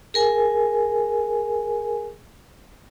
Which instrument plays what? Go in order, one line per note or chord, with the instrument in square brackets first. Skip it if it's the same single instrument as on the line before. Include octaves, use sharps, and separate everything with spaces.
[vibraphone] G#4 A#4 G#5